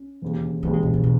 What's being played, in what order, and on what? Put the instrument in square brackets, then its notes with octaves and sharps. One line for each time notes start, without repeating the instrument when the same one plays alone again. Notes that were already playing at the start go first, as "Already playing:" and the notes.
Already playing: [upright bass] C#4
[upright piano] E1 D#2 C#3
[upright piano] E1 D#2 C#3 [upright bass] C#4
[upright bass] G#3
B2
A#2
B2